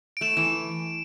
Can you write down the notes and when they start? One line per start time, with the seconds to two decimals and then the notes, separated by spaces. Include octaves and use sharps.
0.17 D7
0.21 A3 E7
0.37 E3